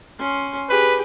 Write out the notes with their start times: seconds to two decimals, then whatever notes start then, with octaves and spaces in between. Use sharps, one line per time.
0.18 C#4 C6
0.69 G4 G#4 B4